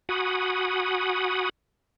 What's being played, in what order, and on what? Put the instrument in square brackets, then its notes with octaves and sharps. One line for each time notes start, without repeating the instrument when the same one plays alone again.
[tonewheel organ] F#4 F#5 G#5 B5 D#6